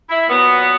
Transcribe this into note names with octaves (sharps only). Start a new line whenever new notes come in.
E4
A#2 F#3 B3